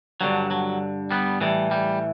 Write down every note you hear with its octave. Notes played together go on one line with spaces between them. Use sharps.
G2 D3 F#3
F#3
G3 B3
A2 E3 G3
G3